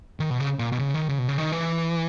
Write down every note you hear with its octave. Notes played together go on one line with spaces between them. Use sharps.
D#3
B2
C#3
A#2
B2
C#3
D#3
C#3
B2
C#3
D#3
E3